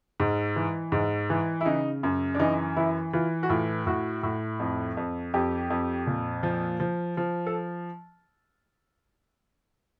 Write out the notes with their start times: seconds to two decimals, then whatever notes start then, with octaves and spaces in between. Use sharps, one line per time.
0.20 G#2
0.56 E3
0.92 G#2
1.30 E3
1.61 E4
1.65 C#3 D#4
2.03 F#2
2.35 D4
2.40 E3 D#4
2.77 E3 E4
3.13 E3 F4
3.43 F#4
3.49 A2 F4
3.87 A2 F#4
4.23 A2
4.60 F2
4.97 F2
5.34 F2 G4
5.70 F2
6.07 A#2
6.43 F3
6.80 F3
7.17 F3
7.47 A4